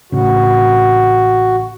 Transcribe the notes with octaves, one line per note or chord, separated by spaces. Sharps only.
A1 A2 C#3 F#4